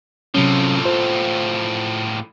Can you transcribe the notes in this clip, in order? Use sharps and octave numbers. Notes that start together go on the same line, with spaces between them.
A2 C3 F3 F#3 C#4
F4 C5